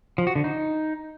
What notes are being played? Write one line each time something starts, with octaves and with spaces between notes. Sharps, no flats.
F3
F#4
D3
D#4